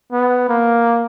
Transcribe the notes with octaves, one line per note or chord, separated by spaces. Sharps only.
B3
A#3